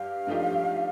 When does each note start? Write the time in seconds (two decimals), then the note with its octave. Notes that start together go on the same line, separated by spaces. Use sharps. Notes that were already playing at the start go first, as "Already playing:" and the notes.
Already playing: G2 G4 F5
0.27 G2 F3 A3 D#4 G4